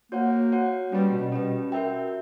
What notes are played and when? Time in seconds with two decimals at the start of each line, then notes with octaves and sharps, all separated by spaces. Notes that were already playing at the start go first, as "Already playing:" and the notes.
0.12 A#3 F#4 C#5 F#5
0.52 F#4 C#5 F#5
0.92 G3 C#4 G4 B4
1.12 B2
1.32 B2 C#4 G4 B4
1.72 F#4 A#4 E5 G5